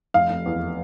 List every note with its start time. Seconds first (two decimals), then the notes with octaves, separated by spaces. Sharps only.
0.14 F1 F5
0.30 F1
0.46 E2